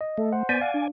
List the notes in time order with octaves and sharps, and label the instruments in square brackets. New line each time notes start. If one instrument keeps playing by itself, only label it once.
[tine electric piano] D#5
[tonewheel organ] A3 [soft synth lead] A4
[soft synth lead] C5 [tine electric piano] F#5
[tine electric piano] B3 G6 B6 [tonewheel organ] D5 G#5
[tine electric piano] F5 [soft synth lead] F#5
[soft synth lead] D4